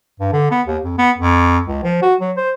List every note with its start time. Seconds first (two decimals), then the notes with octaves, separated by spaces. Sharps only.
0.20 G2
0.33 D3
0.51 B3
0.67 D#2
0.84 F2
0.98 B3
1.18 F2
1.67 C#2
1.83 F3
2.02 F#4
2.21 F#3
2.37 C5